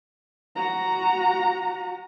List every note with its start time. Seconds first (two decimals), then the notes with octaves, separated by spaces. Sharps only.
0.56 F#4 A#5